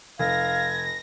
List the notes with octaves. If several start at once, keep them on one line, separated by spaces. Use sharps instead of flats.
F1 F5 G#6 A#6